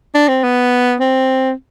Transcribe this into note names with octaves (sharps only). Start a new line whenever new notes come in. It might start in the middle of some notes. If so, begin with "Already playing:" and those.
D4
C4
B3
C4